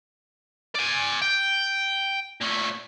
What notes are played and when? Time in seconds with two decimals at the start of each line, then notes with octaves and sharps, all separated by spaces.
0.75 D5 G#5
1.22 G5
2.41 A#2 A3